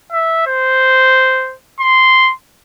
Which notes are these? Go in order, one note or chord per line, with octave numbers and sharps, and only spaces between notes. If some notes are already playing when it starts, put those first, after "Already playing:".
E5
C5
C6